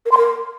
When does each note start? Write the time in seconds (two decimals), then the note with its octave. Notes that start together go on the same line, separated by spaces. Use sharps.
0.06 A#4
0.11 C6
0.17 A#4